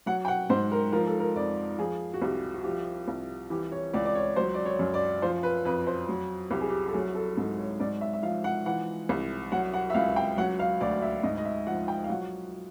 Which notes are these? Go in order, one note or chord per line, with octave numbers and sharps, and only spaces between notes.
F#3 F#5
G5
F#5
G#2 C5
A#4
F3 A#4
A4
A#4
F2 D5
F3 G#4
F#4
C2 G4
F#4
F3 G4
C2
E3 G4
C#5
C#2 D5
D5
C#5
F#3 C5
D5
C#5
F#2
D5
F3 C5
B4
F2 B4
C5
F#3
C2 G4
G#4
G4
A4
F#3 G#4
A4
G#2 A4
C#5
G#2 D5
E5
E5
F3 F5
F#5
E3 F#5
C2
F#3 F#5
F#5
E5
C#2 F5
G5
F#3 F#5
F5
D2 D5
E5
G#2 D#5
D#5
E5
F3 F#5
G5
F5
F#3 F#5